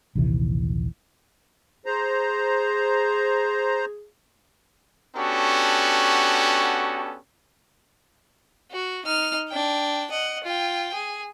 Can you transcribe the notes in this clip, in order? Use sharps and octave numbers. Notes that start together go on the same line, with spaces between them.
A#1 D#2 C3 E3
G#4 C5 A#5
B3 C#4 D4 F#4 G4 A4
F#4
D#4 F6
D4 G5
D#5 F#5
F4 G5
G#4